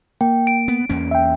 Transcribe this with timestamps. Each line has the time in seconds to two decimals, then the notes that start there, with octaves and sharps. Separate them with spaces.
0.21 A#3 G5
0.47 D7
0.68 B3
0.89 E2 A#3 C#4
1.11 E5 G5